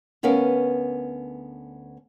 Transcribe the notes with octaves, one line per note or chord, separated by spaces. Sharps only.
D2 B3 C#4 A#4 B4 F5